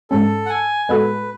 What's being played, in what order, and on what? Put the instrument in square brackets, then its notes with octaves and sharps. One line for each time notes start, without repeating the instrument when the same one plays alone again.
[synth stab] G#2 G#3 C#4 [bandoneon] A4
[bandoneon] F#5
G#5
[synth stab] A2 G#3 B3 F#4 A4 [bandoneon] B4